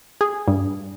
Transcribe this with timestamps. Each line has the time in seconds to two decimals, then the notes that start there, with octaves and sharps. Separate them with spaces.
0.21 G#4
0.48 G2